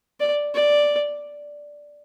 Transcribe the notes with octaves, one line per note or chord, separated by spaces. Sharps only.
D5
D5